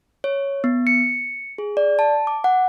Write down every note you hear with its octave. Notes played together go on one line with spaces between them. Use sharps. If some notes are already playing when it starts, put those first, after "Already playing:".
C#5
B3
C#7
G#4
D5
A5
D6
F#5